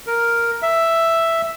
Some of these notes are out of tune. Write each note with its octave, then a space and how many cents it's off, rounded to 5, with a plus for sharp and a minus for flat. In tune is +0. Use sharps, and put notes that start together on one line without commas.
A#4 +0
E5 +5